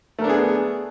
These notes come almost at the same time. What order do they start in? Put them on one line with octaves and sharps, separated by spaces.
A3 A#4 D4 B3 G#4